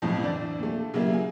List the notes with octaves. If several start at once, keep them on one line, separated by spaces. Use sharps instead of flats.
F2 A2 F3
D3 E3 D5
A#2 A3
C#3 F#3 G3 A#3 E4
G#5